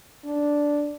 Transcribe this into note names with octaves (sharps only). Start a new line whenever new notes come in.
D4